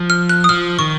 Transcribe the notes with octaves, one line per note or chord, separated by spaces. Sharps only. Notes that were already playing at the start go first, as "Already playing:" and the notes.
Already playing: F3
F6
F#6
D#6
F3 F6
D#3 C#6